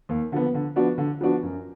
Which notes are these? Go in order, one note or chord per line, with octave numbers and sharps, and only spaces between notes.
D#2
D3 F3 B3
D3
F3 B3 D4 F#4
D3
F3 B3 D4 F#4
F#2